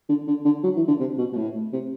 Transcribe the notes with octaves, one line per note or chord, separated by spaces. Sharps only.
D3
D3
D3
F#3
E3
D3
C3
B2
B2
A2
C3